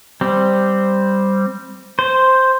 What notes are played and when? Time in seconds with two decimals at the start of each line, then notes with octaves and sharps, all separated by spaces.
0.21 G3 C4
1.99 C5